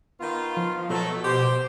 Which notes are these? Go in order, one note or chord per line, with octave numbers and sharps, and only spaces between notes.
D#3 B3 F4
F3
B2 F#3 A3
G4 C5